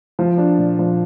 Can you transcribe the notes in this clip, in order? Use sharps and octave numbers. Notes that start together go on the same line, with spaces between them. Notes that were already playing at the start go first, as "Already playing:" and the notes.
F3
D4
A#2
F3